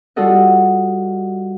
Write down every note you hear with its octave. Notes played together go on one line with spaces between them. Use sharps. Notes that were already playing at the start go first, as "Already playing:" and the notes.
G3 F4 F#4 A4 D#5 F#5